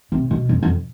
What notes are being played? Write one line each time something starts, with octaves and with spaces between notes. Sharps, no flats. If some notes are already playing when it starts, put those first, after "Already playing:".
C3
B2
F2
F2